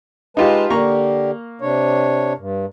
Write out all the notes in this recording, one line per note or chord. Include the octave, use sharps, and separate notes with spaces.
G#3 D#4 F4 G4 B4 A5
D3 A#3 G4 A#5 C#6
C3 D4 C#5
G2